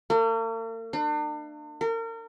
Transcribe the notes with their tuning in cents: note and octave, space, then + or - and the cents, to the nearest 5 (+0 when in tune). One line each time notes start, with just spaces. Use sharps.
A#3 -45
D4 +40
A#4 -35